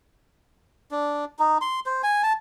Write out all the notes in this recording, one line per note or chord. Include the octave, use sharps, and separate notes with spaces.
D4
D#4
C6
C5
G#5
A5